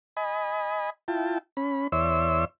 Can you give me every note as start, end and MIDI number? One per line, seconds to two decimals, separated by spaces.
0.17 0.90 75
0.17 0.90 80
0.17 0.90 83
1.08 1.38 64
1.08 1.38 65
1.08 1.38 79
1.08 1.38 81
1.57 1.87 61
1.57 1.87 83
1.92 2.45 40
1.92 2.45 73
1.92 2.45 74
1.92 2.45 76
1.92 2.45 84
1.92 2.45 88